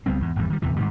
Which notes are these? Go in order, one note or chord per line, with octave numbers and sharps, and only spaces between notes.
C#2 G3 B3 C4
E2 G#2
G#1 E2 A2 G3
D#3 G3
D1 E2 C3 E3
G#2 D#3 G3